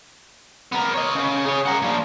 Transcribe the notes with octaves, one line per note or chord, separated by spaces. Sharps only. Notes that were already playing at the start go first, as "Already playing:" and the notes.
B3 A#4
C#5 D#5
C#3
G#4 C#5
A#4 F#5
A#2 F3